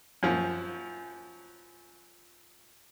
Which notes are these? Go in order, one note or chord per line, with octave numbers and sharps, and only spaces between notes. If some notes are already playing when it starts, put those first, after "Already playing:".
F#2 F3